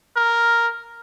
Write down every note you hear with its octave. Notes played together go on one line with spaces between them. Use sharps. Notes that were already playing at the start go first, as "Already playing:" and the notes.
A#4